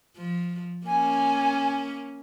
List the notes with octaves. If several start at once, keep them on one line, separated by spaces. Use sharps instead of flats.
F3
A#3 C#4 G#5